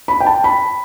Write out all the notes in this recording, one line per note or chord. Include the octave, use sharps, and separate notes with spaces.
B5
G5
A5
B5